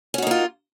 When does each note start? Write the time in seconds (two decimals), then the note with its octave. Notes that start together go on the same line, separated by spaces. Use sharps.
0.14 C#4
0.18 F#4
0.22 D#4
0.27 A#3
0.31 F4